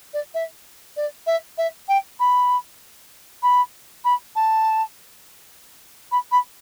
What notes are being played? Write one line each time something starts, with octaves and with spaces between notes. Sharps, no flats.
D5
E5
D5
E5
E5
G5
B5
B5
B5
A5
B5
B5